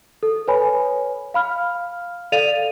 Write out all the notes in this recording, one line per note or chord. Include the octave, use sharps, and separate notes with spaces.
A4
B4 C#5 G#5 B5
F5 B5 F6
A4 D5 F5 A6 D#7 F7